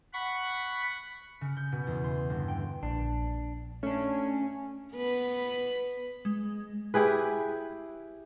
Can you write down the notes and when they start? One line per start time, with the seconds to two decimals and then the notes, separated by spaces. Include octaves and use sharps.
0.13 F#5 B5 C#6
1.41 C#3
1.57 G6
1.72 B2
1.87 E2
2.04 C6
2.30 G1
2.48 G5
2.83 A#1 D4
3.83 A3 C#4 D4
4.95 B3 B4
6.25 G#3
6.94 E4 G4 G#4 B4